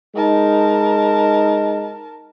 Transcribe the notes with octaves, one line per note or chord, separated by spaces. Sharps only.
G#3 D#4 A#4 A5